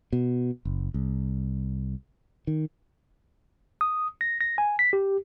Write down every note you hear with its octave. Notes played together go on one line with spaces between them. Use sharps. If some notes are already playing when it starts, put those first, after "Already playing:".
B2
F#1
C2
D#3
D#6
A#6
A#6
G#5
B6
G4